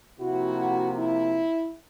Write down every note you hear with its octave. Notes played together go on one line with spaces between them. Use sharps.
C3 F3 A#3 E4 F#4
E4